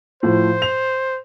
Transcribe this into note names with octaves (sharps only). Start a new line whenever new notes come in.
A2 F3 C5
F7